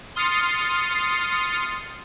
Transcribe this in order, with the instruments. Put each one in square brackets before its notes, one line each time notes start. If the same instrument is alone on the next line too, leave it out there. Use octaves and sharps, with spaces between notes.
[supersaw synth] C6 D#6 F6 A6 C7 C#7